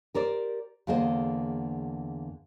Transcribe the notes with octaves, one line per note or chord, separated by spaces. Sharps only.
G4 A#4 C5 D5
E2 D3 A#3 G#4 C5 D#5